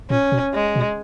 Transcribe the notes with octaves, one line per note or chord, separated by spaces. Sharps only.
A#2 C#4
B2
G#3
B2